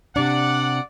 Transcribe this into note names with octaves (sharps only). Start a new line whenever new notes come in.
C3 D4 D5 F#5